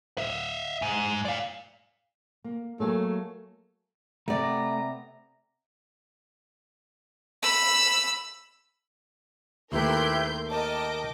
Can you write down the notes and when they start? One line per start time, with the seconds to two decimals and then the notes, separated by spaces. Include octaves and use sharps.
0.18 D#5 E5
0.82 G#2
1.25 D5 F5
2.44 A#3
2.80 F#3 A3 A#3 G#4
4.28 C3 A3 B3 D5 A#5
7.42 B5 E6
9.72 D#2 A3 E4 G4 A#4 B4 C6 G6
10.50 A#4 D#5 G5 A5 D6